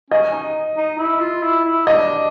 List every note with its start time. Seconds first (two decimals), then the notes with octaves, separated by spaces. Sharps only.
0.11 C#4 D#5
0.33 D#4
0.78 D#4
0.99 E4
1.21 F4
1.43 E4
1.65 E4
1.87 D4 D#5